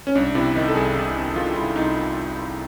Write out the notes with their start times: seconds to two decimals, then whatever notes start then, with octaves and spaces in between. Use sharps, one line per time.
0.07 C#4
0.15 C2 D4
0.35 C3 E4
0.55 D#3 D#4
0.68 A4
0.75 C2 G#4
0.95 C2
1.15 C3
1.35 D#3 F4
1.56 C2 E4
1.76 C2 D#4